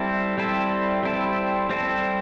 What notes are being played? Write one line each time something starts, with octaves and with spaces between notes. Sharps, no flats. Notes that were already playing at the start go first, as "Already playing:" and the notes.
Already playing: G3 C4 E4 A4
G3 C4 E4 A4
G3 C4 E4 A4
G3 C4 E4 A4